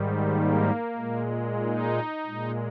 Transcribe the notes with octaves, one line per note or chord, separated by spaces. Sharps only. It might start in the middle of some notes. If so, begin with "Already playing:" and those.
Already playing: G#2 D#3 G3
A#3
A#2 G#3
D#4
A#2 G#3